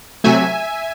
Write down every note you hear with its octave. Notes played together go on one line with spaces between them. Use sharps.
C3 F#3 A3 E5 G#5